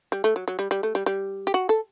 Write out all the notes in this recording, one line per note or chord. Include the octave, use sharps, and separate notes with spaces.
G3
A3
F#3
F#3
G3
G3
A3
G3
G3
G4
F#4
A4